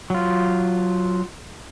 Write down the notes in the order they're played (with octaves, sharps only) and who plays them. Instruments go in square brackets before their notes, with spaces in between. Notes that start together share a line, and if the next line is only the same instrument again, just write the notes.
[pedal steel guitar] F#3 F4